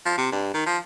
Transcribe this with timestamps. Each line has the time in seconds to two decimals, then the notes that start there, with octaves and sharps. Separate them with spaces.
0.06 F3
0.18 C3
0.32 G2
0.54 D#3
0.66 F3